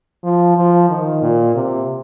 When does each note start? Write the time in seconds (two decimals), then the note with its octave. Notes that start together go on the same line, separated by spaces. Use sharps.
0.24 F3
0.57 F3
0.89 D#3
1.22 A#2
1.55 C3